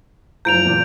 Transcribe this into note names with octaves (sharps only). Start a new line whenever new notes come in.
F#1 F3 A#5 G6 D7 F7
E2 A#2